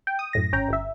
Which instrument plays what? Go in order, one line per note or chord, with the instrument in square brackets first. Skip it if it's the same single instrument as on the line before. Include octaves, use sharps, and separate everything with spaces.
[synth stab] G5
D#6
F#2 A2 A#6
G#1 C#4 G5 A#5
G1 E5